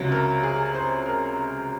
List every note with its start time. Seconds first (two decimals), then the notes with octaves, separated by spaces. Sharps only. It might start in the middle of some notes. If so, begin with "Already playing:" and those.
Already playing: C#2 C3 F#3
0.12 A#4
0.43 G#4
0.74 C5
1.06 A#4